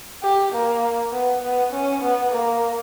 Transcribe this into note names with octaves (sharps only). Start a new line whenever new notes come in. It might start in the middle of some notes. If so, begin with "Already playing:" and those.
G4
A#3
B3
B3
C#4
B3
A#3